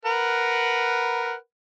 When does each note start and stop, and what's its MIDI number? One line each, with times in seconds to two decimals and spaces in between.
0.05 1.35 70
0.05 1.35 71
0.05 1.35 78